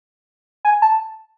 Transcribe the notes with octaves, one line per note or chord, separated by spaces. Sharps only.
G#5
A5